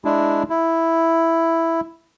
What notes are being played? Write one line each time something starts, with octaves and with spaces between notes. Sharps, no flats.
G#3 D4 E4
E4